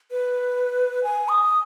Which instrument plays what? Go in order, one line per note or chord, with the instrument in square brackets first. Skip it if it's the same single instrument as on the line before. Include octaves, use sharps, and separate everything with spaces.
[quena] B4
G#5
D#6